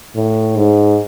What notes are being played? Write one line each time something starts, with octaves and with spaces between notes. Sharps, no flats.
A2
G#2